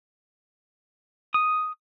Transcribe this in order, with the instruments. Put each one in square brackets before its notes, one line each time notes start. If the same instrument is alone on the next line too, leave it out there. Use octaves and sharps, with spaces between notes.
[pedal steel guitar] D#6